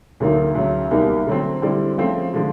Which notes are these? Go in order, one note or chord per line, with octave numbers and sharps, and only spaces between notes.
D2 D3 F#3 A#3 D#4
D2 C#3 F#3
C2 B2 G3 A#3 D#4
D3 F#3 A3 C4
D3 G3 C4 E4
C#3 F3 A3 C4
D3 F3 G#3